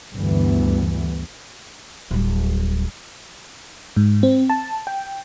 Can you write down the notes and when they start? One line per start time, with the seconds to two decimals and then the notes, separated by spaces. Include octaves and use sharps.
0.14 D2 G2 E3 B3
2.11 D1 G3
3.96 G#2
4.23 C4
4.50 A5
4.87 G5